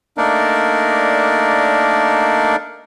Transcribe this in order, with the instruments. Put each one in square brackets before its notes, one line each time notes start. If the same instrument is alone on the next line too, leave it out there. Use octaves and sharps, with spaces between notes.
[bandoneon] A3 A#3 D4 D#4 A#4 D5